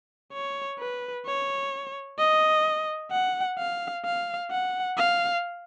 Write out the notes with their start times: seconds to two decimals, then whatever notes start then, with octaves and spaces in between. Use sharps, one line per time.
0.33 C#5
0.79 B4
1.26 C#5
2.18 D#5
3.11 F#5
3.58 F5
4.05 F5
4.51 F#5
4.97 F5